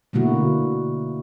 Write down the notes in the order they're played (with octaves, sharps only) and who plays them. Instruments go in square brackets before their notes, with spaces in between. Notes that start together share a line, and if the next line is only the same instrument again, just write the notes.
[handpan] B2 D3 A3 A#3 E4 F#4